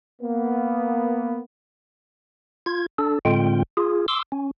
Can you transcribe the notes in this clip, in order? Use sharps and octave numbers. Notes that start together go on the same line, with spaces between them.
A#3 B3
F4 G#6
D4 A4
A2 D3 G#3 C4 F4 G5
F4 G#4
C6 D6 E6
C#4